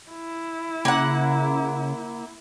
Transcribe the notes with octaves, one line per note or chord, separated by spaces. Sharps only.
E4
C#3 A#3 F#5